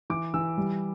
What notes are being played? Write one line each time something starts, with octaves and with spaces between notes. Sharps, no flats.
E3 D6
E3 E6
G3